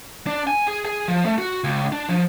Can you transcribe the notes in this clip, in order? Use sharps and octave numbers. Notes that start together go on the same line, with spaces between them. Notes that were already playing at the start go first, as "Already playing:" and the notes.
D4
G#5
G#4
G#4
F3
A3
F#4
C#2
D4
F3